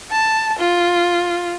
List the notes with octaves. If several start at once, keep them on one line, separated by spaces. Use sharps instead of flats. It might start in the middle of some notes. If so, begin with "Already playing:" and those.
A5
F4